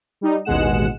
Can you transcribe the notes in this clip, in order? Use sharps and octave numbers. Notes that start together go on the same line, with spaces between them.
G3 D#4
A1 D#2 B2 G#3 F#5 E7